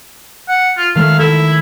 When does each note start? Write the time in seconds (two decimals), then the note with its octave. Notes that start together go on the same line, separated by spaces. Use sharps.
0.48 F#5
0.77 F4
0.95 D#3 A3 F5
1.19 E4 A4